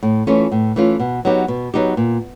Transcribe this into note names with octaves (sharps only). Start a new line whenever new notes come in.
A2
E3 A3 C#4 F4
A2
E3 A3 C#4 F4
B2
F#3 B3 D#4 G4
B2
F#3 B3 D#4 G4
A#2